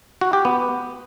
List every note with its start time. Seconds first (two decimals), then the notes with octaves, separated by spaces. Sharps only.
0.21 F#4
0.33 G4
0.45 B3